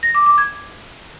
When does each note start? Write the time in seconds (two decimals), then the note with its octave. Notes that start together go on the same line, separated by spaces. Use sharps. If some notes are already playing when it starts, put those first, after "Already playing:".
0.03 A#6
0.15 D6
0.26 D6
0.38 G#6